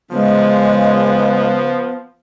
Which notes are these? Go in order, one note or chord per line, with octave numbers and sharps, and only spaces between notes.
C#3 F3 G#3 B3